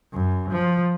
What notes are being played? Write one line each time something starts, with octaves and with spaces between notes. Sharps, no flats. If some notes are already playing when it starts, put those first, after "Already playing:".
F#2
F3